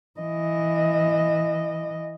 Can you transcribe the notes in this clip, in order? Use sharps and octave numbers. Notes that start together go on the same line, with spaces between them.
E3 D#5